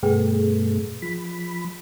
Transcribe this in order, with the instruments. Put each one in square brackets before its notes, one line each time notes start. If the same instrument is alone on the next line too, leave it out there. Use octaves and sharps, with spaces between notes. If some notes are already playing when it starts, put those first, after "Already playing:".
[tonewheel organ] G2 B2 A3 [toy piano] G#4 B4 G5
[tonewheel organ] F3 B5